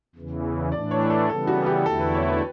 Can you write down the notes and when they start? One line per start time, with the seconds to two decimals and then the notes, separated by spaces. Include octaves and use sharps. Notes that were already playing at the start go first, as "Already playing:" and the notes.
0.15 E2 C#3 E3
0.72 A2 E3 A3 D4 D5
0.91 C#5
1.10 A4
1.29 C#3 E3 G3 B3 A4
1.47 F#4
1.66 G4
1.86 E2 D3 A3 E4 A4
2.00 B4
2.15 C#5
2.29 B4